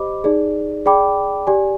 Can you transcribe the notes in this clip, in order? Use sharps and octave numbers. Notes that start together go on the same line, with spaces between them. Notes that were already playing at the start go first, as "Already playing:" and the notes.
Already playing: G4 C5 D#5 B5 D6
D#4 G#4 D5
G#4 D5 G5 B5 D6
G4 D5 G#5